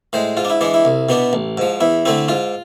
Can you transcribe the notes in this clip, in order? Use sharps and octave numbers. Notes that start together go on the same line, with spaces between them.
A2 G#3 C5
G#2 F4
D4
E4
E3 G#3 D4
E4
C2
B2 B3 D4
A1
G#2 F3
E2 E4
D3 A3 C4 E4
G#2 F4